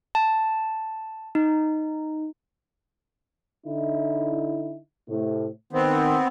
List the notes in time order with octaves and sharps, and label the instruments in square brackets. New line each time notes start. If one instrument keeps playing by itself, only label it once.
[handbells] A5
D#4
[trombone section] D3 D#4 E4
A2 C3
[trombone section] D#3 [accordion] B3 C4